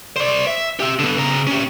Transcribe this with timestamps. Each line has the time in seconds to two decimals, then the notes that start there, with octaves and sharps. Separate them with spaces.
0.16 C5 D5
0.47 E5
0.80 G4 E5
0.99 D3 B3
1.18 C#3 A#5
1.47 C#4 G4